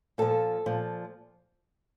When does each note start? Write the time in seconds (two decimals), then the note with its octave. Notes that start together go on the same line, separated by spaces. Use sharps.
0.18 A#2 F3 A4
0.66 A#2 F3